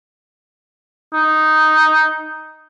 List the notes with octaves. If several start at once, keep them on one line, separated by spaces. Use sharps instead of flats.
D#4